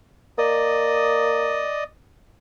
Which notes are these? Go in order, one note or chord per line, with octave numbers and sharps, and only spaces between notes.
A#3 D5 D#5 D#6